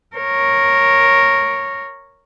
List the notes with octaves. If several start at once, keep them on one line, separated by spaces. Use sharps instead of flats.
A#4 C#5